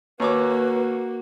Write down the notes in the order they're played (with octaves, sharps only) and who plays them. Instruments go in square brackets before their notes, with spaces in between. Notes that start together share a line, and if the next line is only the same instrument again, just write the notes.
[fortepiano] D#2 C#5 D6 [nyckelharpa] A#3 F#4 [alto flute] B4